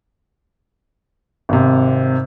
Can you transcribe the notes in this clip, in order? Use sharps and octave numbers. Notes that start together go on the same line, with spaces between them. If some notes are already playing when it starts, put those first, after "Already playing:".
G#1 C3